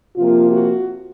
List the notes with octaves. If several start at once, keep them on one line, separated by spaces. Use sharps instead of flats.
C3 F3 A#3 F4
F#4